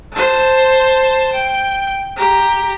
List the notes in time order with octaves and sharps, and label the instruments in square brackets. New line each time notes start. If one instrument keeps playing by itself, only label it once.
[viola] C5 A5
G5
G4 A#5